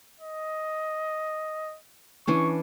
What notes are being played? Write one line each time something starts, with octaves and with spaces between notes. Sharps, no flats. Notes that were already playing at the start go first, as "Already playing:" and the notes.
D#5
E3 C#4 D4 C#6